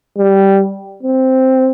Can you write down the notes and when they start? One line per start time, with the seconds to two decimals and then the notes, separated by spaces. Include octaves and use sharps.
0.18 G3
1.03 C4